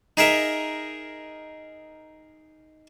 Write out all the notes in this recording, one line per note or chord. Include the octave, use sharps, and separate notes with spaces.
D#4 G#4 A#4 E5